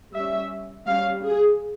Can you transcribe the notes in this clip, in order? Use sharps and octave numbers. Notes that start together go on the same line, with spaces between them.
G3 C#4 E5
G3 C#4 F5
G#4